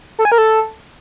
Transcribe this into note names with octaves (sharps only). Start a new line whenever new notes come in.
A4
G#5
A#4
A4